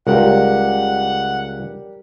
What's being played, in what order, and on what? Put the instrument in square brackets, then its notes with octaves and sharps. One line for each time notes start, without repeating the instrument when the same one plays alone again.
[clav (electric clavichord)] C#2 [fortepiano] G3 G4 A#4 [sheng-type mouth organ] F#5